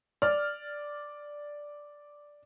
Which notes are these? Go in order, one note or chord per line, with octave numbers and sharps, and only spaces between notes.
D5 F6